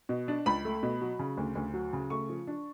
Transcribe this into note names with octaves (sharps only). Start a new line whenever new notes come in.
B2
D4
C#2 B5
A3
B2
F#3
C#3
D2
D2
F#3
C#3
A3 C#6
F3
D4